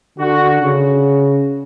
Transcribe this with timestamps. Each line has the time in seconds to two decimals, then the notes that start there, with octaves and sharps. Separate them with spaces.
0.18 D3 F#4
0.61 C#3